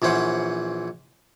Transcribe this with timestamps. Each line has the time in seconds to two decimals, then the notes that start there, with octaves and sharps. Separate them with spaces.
0.02 A#1 E3 C#4 C5 F#5